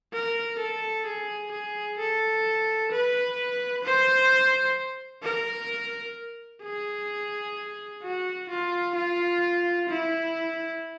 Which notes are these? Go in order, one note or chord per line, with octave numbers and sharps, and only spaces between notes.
A#4
A4
G#4
G#4
A4
B4
C5
A#4
G#4
F#4
F4
F4
E4